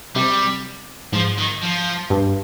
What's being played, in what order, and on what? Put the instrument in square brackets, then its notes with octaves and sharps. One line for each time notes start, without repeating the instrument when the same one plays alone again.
[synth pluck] C3 [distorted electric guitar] G3
[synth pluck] G#2 [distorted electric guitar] F3
[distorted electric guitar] D#3
F3
[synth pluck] G2